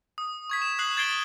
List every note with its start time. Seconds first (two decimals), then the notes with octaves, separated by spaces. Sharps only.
0.18 D#6
0.50 C#6 G#6 B6
0.62 E7
0.79 D#6 F#6 B6 C7 F#7
0.97 G#6 A6 C7 D7 G7